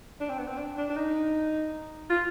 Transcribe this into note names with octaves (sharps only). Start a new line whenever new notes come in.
D4
C4
B3
C4
D4
D4
D4
D#4
F4